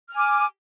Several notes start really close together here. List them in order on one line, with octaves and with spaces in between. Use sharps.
F6 G#5 D6